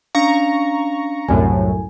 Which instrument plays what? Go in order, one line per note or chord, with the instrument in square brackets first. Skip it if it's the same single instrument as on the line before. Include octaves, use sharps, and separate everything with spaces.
[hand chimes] C#4 D4 F5 [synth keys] A#5 C#6
[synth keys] C2 F#2 A2 [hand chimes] G#5